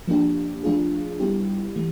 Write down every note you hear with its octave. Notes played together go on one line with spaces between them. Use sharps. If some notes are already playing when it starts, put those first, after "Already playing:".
F3 A#3 D4 G4
F3 A3 D4 F4 G#4
G3 B3 E4 G4
E3 A3